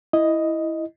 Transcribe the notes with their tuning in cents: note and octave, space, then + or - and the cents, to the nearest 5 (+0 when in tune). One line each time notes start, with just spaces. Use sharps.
E4 +0 D#5 +0